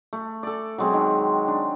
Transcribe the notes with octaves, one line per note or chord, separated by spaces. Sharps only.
A3
A4 D5
F#3 G#3 C4
D#3
D4